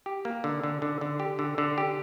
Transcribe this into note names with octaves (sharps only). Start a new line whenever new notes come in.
G4
A#3
D3
D3
D3
D3
G4
D3
D3
G4